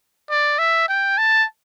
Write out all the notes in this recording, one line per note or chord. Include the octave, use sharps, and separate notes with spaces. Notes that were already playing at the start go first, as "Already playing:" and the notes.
D5
E5
G5
A5